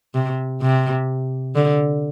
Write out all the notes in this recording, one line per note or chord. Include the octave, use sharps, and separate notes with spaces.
C3
C3
D3